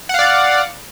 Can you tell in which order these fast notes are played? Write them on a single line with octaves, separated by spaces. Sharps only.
F#5 F5 D5